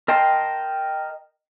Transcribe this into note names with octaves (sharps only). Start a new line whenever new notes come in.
A#4 D#5 G5 A5 C6